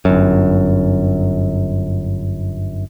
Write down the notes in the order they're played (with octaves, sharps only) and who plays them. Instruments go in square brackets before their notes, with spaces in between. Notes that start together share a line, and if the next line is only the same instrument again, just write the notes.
[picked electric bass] G1 F#2